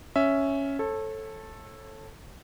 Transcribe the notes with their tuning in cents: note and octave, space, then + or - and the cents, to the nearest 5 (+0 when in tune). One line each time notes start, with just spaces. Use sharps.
C#4 +0 E5 +0
A4 +0 C#5 -35